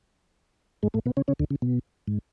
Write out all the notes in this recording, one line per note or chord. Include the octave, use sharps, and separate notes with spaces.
G#2 G#3
A2 A3
B2 B3
C#3 C#4
C#3 C#4
D2 D3
C#3
B2
G#2